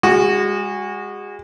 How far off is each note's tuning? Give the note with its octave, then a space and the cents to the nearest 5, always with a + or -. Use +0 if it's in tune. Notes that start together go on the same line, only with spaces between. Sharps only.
G#3 -30 F#4 +0